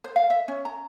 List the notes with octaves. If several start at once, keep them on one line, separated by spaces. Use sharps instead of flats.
C5
F5
E5
C#4
A#5